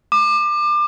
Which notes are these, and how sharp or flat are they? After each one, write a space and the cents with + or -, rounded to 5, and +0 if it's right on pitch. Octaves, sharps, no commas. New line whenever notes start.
D6 +30